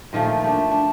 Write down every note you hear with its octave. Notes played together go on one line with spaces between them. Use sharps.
A#2 D#3 F3 A3
A3 D4
D4